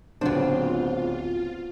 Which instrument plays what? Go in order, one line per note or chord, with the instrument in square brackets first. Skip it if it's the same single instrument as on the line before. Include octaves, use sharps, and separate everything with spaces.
[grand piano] D1 C#3 D4 [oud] B3 C4 [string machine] F4